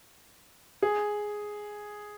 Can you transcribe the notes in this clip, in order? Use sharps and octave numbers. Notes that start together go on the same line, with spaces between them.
G#4